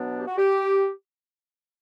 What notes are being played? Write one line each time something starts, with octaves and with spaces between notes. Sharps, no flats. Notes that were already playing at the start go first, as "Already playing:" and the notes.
Already playing: B2 F#3 B3 D4
G4
F#4
G4